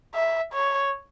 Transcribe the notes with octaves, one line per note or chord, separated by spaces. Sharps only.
E5
C#5